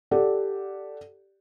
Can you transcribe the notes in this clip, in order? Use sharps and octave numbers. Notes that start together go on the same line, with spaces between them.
G4 A4 D5 F#5